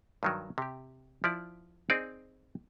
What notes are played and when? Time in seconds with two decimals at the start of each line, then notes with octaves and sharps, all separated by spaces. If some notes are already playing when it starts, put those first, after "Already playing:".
0.23 G2 D#3 F#3
0.58 C3 G4
1.24 F3 E4 D5
1.90 C4 D#4 G#4 D5